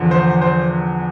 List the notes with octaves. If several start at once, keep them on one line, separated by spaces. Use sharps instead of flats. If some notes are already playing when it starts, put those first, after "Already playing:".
Already playing: E2 D3 F3
C5
C5